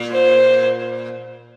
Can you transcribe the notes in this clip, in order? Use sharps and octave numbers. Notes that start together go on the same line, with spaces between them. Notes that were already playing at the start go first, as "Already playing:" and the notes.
Already playing: A#2
C5